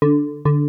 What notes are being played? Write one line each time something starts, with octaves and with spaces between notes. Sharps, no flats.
D3
D3